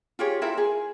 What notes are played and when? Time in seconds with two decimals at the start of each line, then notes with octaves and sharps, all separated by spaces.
0.19 F4 G4 G#4 C#5
0.42 E4 F4 A#4 E5
0.57 G#4